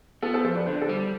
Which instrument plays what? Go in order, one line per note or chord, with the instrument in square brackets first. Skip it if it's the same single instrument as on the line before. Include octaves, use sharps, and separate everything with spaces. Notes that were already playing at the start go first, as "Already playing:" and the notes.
[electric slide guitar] B3 [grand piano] F4 A4
[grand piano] A4 C5
[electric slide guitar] F2 [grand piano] A4 C5
[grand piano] B4 D5
[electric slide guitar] D3 [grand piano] C5
[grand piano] D5
A4 C5
[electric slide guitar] G3